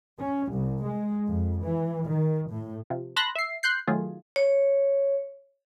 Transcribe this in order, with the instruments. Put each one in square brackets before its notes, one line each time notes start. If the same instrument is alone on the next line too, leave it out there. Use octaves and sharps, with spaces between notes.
[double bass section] C#4
C2
G#3
F2
E3
D#3
A2
[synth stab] C3 F3
A5 B5 C6 F#6 A#6
E5 C7
C6 F#6 G6 C7
D#3 F#3 A3 F4 G#4
[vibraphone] C#5